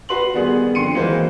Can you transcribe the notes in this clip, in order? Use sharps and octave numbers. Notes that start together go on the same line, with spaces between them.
F#4 B4 C6 F#7
D#3 G3 B3 G#4
F2 D3 C6 C#7 D#7
D#3 E3 F#3 G#3 A#3 C5